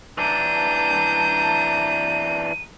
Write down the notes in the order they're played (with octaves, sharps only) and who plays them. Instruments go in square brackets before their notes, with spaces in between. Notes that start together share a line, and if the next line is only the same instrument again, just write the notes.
[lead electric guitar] E3 D4 [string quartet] A5 A#5 G6 [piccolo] D#7